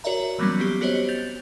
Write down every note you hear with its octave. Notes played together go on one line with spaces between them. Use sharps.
F#4 A#4 C#5 D5 E5 A#5
E3 F#3 G3 A#3 B3 C#4
B3 C4 G4
B3 F#4 G4 C5 C#5 D#5
G6 A6 F7